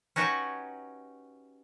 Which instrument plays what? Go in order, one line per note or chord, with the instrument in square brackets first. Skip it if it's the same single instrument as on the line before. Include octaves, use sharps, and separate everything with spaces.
[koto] C#4 D#4 F#4 G4 B4 C#5